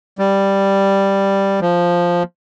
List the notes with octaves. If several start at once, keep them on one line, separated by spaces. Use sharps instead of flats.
G3
F3